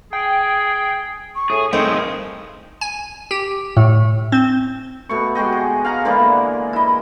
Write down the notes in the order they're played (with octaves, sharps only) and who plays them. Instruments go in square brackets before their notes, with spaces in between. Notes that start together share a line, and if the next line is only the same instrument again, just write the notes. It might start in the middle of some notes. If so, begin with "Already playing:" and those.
[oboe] G#4 [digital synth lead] G5
[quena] C#6
[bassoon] A2 [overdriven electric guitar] G#4
[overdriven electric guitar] A2 [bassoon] D#3 [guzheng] C4 D#4 G#4 [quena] C6
[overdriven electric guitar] G2 F3
[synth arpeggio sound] G#5
G4
A2
C4
[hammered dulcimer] B2 A3 C#6
G#3 F#4 G4 D#5
G#4
F5 F#5 G#5 A#5
D3 E3 G#3 A#3
E4 D#5